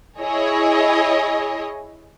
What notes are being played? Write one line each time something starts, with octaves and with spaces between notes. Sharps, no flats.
E4 G#4 C#5 D#5